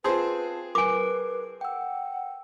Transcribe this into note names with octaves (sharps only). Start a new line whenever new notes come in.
C4 F4 G#4 B4 C5 A5
A#4 B4 G#5 D6
F#5 G5 E6